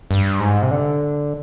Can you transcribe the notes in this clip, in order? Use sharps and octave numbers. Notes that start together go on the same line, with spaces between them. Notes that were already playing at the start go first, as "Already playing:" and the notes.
G2
G#2
C3
D3